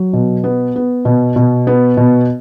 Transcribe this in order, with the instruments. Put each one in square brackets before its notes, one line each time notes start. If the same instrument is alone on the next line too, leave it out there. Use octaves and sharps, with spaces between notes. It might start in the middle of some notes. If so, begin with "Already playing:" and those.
Already playing: [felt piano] F#3
B2
B3
B3
B2
B2
B3
B2